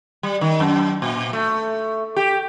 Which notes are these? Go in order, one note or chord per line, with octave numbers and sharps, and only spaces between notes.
G3
D#3
F#2
A#2
A3
G4